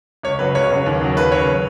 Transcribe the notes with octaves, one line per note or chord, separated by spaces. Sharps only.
C#2 C#5
C#3 F#3 B4
C#2 C#5
C#3 F#3
D#2
C#3 F#3
D#2 B4
C#3 F#3 C#5